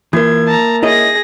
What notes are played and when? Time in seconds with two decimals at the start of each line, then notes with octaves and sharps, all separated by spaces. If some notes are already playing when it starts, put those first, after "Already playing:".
0.13 E3 A#3 F4 A#4 G#6
0.47 A5 A#5
0.83 E4 G#4 C#5 D#5 A#6